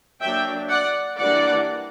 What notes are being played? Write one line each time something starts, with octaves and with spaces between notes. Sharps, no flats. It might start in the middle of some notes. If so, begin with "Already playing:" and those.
F#3 A#3 D4 E5 G5
D5 F#5
E3 G3 A#3 D4 D5 F#5